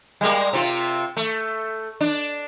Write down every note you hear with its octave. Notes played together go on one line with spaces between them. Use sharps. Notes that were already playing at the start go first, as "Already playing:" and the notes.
G3 G#3 A#3
C3 C4 F4
A3
D4